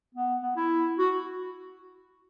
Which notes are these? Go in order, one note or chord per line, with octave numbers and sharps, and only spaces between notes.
B3
B3
E4
F#4